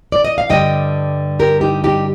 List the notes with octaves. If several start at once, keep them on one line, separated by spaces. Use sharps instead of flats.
D5
D#5
F5
G2 D3 G3 D#5 G5
G4 A#4
D#4 G4
D#4 G4